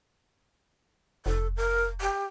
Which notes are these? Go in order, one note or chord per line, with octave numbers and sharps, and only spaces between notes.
F1 A4
A#4
G4